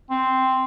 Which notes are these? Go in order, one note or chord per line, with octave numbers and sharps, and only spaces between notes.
C4